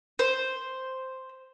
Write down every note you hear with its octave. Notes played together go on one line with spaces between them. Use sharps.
C5